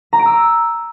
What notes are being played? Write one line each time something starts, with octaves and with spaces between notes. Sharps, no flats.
A#5
D7
E6